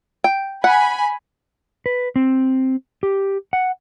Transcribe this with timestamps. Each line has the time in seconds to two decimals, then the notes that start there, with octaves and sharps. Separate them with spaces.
0.24 G5
0.64 F#5 G#5 B5
1.86 B4
2.16 C4
3.03 G4
3.53 F#5